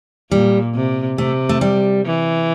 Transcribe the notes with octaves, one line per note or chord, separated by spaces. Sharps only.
A#2 G3
C3
C3 A3
A3
G3
E3